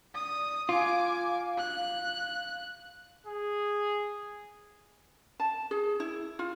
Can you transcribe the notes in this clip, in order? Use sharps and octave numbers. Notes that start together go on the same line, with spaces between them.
D5 D#6
F4 F5 G#5 D6
F#6
G#4
A5
G#4
E4
F4